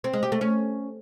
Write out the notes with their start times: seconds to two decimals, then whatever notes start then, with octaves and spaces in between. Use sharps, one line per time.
0.04 C4
0.13 G#3
0.23 G4
0.32 A3
0.41 C#4